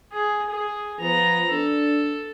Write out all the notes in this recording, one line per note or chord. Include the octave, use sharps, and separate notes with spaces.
G#4
G#4
F3 B3 A#5
D4 A4